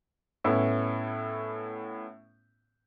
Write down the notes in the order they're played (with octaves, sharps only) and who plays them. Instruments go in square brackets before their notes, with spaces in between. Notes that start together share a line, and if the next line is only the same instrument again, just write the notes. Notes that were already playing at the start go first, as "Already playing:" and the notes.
[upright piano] A2 B3 C#4 E4